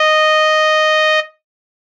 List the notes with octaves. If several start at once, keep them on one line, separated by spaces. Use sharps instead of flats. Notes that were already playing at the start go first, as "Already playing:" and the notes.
Already playing: D#5